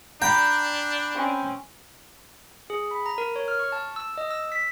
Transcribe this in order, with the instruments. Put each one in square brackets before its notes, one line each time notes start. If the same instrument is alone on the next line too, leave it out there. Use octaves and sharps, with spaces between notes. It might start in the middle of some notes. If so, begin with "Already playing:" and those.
[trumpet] D4 [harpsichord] G5 [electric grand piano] A#5 B5
[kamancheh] C4 C#4
[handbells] G#4
B5
A#5
A#4
C#5
F6
C#6
A5
E6
D#5
E6
B6